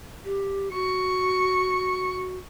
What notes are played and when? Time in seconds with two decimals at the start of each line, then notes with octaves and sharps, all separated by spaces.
0.24 G4
0.73 F#4 C#6